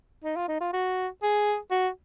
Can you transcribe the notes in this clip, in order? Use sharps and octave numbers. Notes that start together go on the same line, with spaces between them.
D#4
F4
D#4
F4
F#4
G#4
F#4